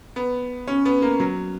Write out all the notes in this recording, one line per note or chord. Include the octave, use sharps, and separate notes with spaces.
B3
C#4
B3
A#3
F#3